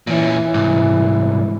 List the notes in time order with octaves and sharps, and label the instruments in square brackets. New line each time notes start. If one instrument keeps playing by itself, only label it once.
[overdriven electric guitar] A#2 C#4 [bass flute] E3
[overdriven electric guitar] C2 G#2